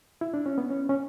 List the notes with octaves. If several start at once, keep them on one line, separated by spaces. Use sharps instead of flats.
E4
D4
C#4
B3
C#4
C#4